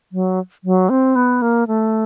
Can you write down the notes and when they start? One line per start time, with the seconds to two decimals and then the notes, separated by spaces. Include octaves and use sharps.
0.12 F#3
0.64 F#3
0.90 C4
1.16 B3
1.42 A#3
1.67 A3